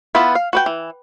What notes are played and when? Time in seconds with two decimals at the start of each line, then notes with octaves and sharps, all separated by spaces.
0.15 B3 E4 F4 B4
0.35 F5
0.53 F#4 B4 G5
0.66 E3